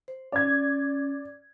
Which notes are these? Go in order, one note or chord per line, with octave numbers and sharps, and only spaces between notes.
C5
C#4 D5 G#6